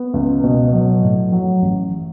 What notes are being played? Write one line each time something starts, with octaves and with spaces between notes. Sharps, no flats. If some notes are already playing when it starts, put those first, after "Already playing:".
Already playing: B3
C#2
B2
F#3
A2
F#3
A1